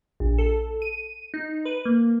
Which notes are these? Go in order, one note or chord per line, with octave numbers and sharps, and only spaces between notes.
A#1
A4
D#7
D#4
B4
A#3